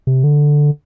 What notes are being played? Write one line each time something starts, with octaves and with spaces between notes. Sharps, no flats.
C3
D3